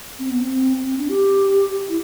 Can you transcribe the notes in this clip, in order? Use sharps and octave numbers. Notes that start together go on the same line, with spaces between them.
C4
B3
C4
C4
D4
G4
E4